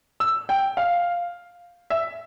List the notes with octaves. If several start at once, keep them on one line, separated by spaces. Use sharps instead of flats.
E6
G5
F5
E5